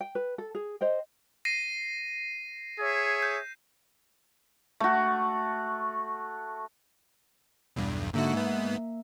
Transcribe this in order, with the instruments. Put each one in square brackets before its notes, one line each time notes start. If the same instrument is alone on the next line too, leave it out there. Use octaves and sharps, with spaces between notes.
[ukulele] G5
B4
A4
G#4
C5 D#5 G5
[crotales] A#6 C7 D#7
[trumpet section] G#4 C#5 E5
[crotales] G6
[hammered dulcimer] A3 F#4
[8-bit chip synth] B1 E2 G2
[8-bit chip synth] G#2 D3 F#4 [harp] A#3 E5
[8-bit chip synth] G#2 B3